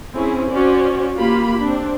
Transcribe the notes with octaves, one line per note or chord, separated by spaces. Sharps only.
C4 C#4 E4 G#4
C#4 F#4 C5 D5
A#3 F4 G4 B5
C4 D4